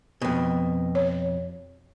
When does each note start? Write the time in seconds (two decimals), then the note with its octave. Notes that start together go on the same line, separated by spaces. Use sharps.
0.22 F2 B2
0.95 C#5